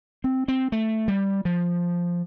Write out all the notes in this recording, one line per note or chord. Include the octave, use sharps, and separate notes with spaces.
C4
C4
A3
G3
F3